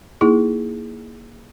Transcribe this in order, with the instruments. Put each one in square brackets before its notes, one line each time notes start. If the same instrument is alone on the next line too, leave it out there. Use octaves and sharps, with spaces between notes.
[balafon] A#3 D#4 E4 G#4